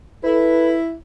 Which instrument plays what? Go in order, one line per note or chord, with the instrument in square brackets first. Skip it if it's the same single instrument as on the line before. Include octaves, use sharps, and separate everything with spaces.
[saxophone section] E4 [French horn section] A4 B4